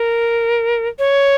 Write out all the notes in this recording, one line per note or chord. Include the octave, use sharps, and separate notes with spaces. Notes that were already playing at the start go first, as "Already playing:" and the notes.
Already playing: A#4
C#5